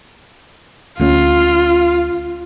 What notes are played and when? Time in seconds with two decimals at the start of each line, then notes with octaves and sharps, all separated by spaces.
1.00 D2 A3 C#4 F4